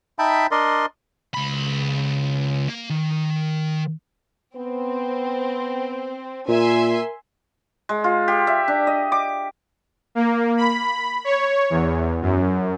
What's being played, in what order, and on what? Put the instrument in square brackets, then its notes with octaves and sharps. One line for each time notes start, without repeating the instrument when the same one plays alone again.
[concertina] D#4 E5 G5 A5 B5
D4 A#4 D5 D#5 C6
[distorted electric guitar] C#2 B5
A#3
D#3
[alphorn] B3 [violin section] C4
[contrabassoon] A#2 [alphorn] A#4 [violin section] E5 G#5 C6
[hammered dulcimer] G#3
F4
G4
E5
D4
D#5
D6
[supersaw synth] A#3
B5
C#5
E2
F#2